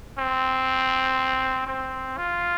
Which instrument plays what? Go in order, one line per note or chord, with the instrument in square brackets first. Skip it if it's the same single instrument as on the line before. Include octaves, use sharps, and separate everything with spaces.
[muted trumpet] C4
C4
F4